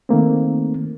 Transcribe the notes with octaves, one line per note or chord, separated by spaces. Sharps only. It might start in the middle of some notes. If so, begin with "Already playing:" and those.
D#3 A3 A#3 C4